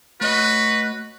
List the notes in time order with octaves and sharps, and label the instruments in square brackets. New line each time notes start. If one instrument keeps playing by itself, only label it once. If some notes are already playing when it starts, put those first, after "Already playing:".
[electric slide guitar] A3 C#5 D#5 [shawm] F#4 [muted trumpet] B4